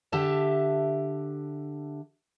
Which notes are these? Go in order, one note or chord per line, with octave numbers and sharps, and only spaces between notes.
D3 G4 E5 A5